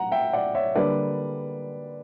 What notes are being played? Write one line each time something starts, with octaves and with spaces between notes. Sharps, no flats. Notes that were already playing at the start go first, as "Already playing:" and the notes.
Already playing: F#5 A#5
E5 G5
D5 F#5
C#5 E5
D3 G3 A#3 D4 B4 D5